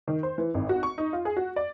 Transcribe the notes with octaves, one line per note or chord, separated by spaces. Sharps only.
D#3
C5
E3
G#1
F#4
C#6
D#4
F4
G#4
F#4
D5